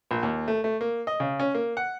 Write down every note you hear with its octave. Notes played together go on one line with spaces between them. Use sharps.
A#1
D#2
A3
A3
A#3
D#5
C#3
C#4
A#3
F#5